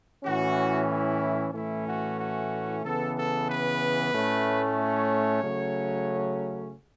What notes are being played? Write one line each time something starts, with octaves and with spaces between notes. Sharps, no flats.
A2 E3 C#4 F#4
E4
A2 E3 A3 C#4 E4
F#4
F#4
C#3 E3 B3 A4
A4
B4
A2 A3 C#4
C#5
C#3 F#3 A3 C#4